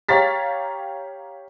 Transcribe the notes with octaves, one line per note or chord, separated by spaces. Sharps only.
G4 C#5 F5 A#5 A6 B6